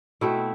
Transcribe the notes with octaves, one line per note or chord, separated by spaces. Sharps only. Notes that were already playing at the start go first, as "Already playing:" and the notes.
B2 A3 C4 E4